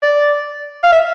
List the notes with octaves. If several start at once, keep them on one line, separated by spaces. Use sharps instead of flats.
D5
F5
E5